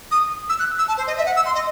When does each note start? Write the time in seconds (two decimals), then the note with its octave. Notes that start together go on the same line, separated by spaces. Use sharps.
0.11 D#6
0.49 E6
0.60 F#6
0.79 E6
0.88 A5
0.97 C5
1.07 D#5
1.17 E5
1.26 F#5
1.36 E6
1.46 C6
1.55 D#5